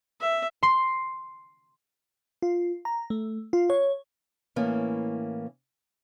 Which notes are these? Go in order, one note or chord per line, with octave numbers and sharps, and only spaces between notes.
E5
C6
F4
A#5
A3
F4
C#5
A2 E3 A#3 C#4